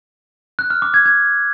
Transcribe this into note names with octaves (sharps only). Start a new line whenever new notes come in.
F#6
F6
D6
G#6
G#6